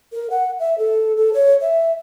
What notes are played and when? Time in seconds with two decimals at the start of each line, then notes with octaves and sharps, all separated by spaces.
0.13 A#4
0.30 F#5
0.59 E5
0.78 A4
1.16 A4
1.34 C#5
1.61 E5